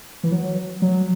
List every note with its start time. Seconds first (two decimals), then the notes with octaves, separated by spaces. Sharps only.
0.23 E3
0.32 F#3
0.82 F#3